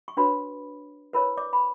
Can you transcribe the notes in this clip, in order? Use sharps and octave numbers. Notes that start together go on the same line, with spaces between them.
C#6
D4 F#4 B4 C#5 B5
E4 A#4 B4 C#5 B5
D5 D6
B5